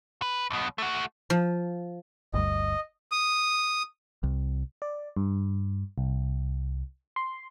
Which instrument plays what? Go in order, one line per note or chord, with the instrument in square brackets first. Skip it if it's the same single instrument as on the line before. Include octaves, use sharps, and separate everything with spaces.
[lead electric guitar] B4
B1 B2
A3 F#4
[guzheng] F3
[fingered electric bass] G1 D2 G2 [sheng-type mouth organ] D#5
[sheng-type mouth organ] D#6
[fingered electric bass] C2
[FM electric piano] D5
G2
C2
C6